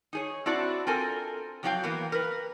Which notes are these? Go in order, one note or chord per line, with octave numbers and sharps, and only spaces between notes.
D#4 G#4 C#5
C4 D4 E4 F#4 D5
C4 F4 A4 A#4 G#5
F2 F#3 C4 F#4 F5 G5
E3 A#3 B3
A#4 B4